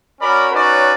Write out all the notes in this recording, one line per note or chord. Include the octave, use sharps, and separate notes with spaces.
C#4 F#4 A#4 D5 B5
C#4 D#4 F#4 B4 C#5 D5